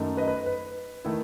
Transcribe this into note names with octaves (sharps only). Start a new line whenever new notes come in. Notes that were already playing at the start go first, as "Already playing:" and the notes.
Already playing: F#2 D#3 A3 D#4
B4 D#5
B4
B4
D#3 A3 E4